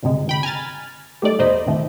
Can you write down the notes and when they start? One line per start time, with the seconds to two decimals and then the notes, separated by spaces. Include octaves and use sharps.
0.03 D2 G2 C3 G#3
0.27 D2 G5 B5
0.43 G#5 A#5 F6 A6
1.22 G3 A3 D#4 D5
1.39 E2 B2 D#4 C5 D#5 B5
1.66 B1 F2 A2 D#3 A3